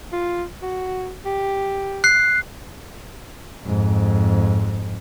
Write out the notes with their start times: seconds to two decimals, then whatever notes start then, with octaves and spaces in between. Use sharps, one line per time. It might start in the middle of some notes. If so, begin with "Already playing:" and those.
0.12 F4
0.62 F#4
1.25 G4
2.04 F#6 C7
3.64 F2 G#2